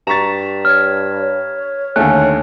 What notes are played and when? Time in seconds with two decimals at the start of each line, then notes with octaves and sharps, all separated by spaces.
0.07 G2 A#5 C#6 A6 B6 E7
0.65 C#5 F6 G#6
1.20 C#5
1.96 D#2 D3 A3 C#4 G#5 F#6